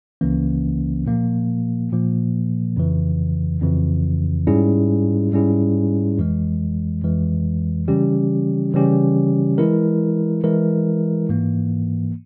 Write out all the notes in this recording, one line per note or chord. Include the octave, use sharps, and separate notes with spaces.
C#2 C#3 E3 A#3 C#4
A#2 F3 A#3
A#2 F3 A#3
F2 C#3 E3
F2 C#3 E3
G#2 G3 C#4 E4 G#4
G#2 G3 C#4 E4 G#4
F2 E3 G#3
F2 E3 G#3
C#3 E3 G3 C#4 G4
C#3 E3 G3 C#4 G4
E3 G#3 E4 A#4
E3 G#3 E4 A#4
G#2 E3 A#3